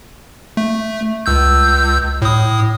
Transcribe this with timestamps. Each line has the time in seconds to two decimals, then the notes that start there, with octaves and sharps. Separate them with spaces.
0.57 A3
1.26 C#2 E6 G6
2.22 A2 D#6